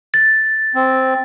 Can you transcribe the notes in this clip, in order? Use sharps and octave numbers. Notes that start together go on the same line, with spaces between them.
A6
C4